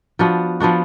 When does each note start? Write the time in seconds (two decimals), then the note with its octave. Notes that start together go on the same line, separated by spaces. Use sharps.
0.19 F3 B3 D4 F#4
0.60 F3 B3 D4 F#4